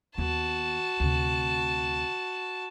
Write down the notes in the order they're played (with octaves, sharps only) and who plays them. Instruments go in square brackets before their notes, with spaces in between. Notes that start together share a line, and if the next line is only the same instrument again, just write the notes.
[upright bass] D#2 B3 [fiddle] F#4 A5
[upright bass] D2 C3